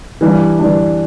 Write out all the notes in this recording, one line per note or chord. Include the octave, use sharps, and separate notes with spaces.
E3 G3 D4
E3 G3 D4